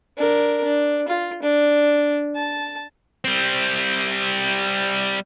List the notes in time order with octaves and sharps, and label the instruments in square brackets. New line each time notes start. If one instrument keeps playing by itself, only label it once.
[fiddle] D4 A#4
D4
F4
D4
A5
[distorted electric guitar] G3 C4